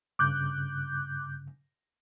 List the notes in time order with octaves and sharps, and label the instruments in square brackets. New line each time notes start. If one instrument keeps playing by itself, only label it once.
[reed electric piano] G2 C#3 [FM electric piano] D6 F#6 G6